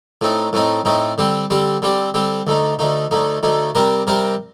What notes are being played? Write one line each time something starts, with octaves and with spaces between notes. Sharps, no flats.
A2 A3 C4 D#4
A2 A3 C4 D#4
A2 A3 C4 D#4
D3 G3 C4 G4
D3 G3 C4 G4
D3 G3 C4 G4
D3 G3 C4 G4
D2 D3 A3 D#4
D2 D3 A3 D#4
D2 D3 A3 D#4
D2 D3 A3 D#4
C3 G3 C4 G4 A#4
C3 G3 C4 G4 A#4